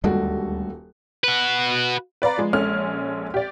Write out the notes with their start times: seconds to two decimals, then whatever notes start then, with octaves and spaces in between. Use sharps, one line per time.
0.04 D#1 D2 G3 G#3 F#4 A4
1.24 F#4 B4
2.22 B4 D5 F5 A#5
2.38 F3 G#3
2.53 A#1 G#3 C#4 A4 F6
3.34 G4 D5